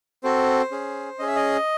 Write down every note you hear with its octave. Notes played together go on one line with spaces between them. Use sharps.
C4 F#4 A4 C5
C#4 G#4
C#4 G#4 D#5
E5
D#5